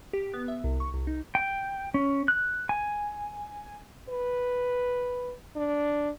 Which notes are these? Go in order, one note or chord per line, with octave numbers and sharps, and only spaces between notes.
G4
B3
E5
C2
C#6
C2
D#4
G5
C#4
F#6
G#5
B4
D4